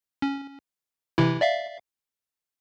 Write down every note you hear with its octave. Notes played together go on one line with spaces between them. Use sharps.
C#4
C3 E3 E4
D5 E5 F5